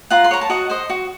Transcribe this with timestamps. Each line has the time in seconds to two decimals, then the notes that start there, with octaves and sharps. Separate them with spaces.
0.10 F4 F#5 A#5
0.24 C6
0.31 A#4 C#5 A#5
0.41 A5
0.50 F#4 D#5 F#5
0.70 C5 D#5
0.90 F#4